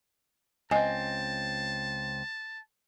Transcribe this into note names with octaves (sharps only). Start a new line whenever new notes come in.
C#2 C4 D#5 G#5 A5